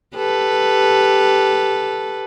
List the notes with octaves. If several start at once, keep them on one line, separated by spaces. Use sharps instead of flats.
G4 A4 B4